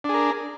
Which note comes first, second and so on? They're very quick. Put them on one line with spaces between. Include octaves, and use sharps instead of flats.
D4 G#4 A#4